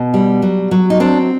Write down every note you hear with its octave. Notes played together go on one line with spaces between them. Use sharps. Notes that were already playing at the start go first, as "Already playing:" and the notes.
Already playing: B2
G3
F#3
F#3
D#4
C4 D4